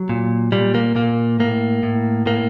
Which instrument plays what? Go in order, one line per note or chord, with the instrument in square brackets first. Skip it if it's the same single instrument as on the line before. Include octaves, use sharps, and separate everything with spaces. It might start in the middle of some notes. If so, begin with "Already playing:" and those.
Already playing: [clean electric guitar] F#3
A#2
A#2 G3
A#3
A#2 A#3
A2 A#3
A2
A2 A#3